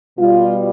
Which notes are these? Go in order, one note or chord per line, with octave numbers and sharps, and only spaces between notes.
B2 G3 F4